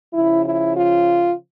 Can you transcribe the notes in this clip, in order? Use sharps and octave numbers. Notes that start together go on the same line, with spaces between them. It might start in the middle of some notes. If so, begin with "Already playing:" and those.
C#3 F3 E4
E4
F4